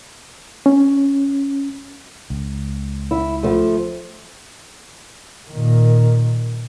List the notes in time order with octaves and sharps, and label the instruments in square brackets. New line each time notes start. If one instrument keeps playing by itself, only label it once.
[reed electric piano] C#4
[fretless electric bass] C#2
[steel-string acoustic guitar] E4
F3 A3
[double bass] A#2 D#3